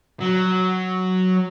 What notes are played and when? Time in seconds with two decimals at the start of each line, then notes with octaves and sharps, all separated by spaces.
0.21 F#3